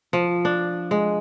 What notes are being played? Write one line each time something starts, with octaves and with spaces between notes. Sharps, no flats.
F3
D4
G#3